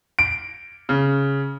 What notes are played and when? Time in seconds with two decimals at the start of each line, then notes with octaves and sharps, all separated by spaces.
0.19 D7
0.89 C#3